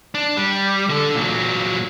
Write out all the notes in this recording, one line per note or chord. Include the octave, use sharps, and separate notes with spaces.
D4
G3
D3 A4
A#2 F#3